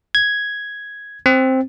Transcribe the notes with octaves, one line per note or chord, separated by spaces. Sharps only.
G#6
C4